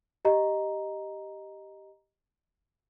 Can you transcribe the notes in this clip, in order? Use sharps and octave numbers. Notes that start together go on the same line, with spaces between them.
G4 D#5 A#5